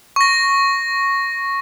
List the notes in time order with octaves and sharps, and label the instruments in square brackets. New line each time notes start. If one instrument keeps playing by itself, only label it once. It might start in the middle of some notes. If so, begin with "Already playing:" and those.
[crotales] C#6 A#6